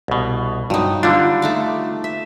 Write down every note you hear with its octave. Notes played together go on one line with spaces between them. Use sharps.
C2 B2
G2 F#3 D#4
D3 G3 D4 F4
A3 D#4 D6
E5